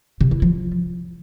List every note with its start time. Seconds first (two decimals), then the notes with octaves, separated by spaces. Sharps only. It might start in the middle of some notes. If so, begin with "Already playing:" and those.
0.21 C3
0.31 E4
0.42 F3